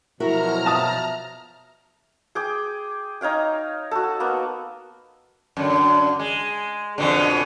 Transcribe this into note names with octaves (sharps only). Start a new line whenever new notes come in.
B2 F3 F#3 E4 F#4 A#4 A#5 F6
E5 A5 D#6
G#4 G5 D6
D#4 C#5 F5 G5
F#4 A4
A#3 B3
F#2 D3
G#3
F2 B2 D3